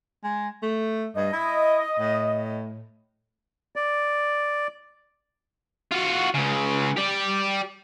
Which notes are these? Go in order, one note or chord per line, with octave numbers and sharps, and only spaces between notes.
G#3
A3
G2 D#5
E4
A2
D5
F4 F#4
C#2 C#3
G4 D5